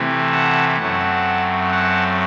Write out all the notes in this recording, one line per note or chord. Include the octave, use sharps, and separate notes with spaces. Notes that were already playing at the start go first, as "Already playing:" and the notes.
Already playing: C3 E3 A3 C4
F#5 A5
F#2 F#3 A3 C4 F#5 A5
F#5 A5